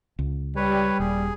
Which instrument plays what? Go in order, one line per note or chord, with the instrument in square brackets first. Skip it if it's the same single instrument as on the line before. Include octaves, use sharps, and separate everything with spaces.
[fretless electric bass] C#2
[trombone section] G3 [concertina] B4 C#5
[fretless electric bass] D#1 [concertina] G#4